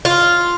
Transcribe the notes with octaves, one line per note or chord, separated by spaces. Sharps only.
F4